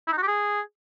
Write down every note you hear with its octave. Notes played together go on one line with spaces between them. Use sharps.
E4
D#4
F#4
G4
G#4